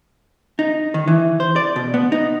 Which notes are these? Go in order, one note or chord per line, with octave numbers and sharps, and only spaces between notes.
D#4
D#3
E3
C5
D5
B2
B3
D#4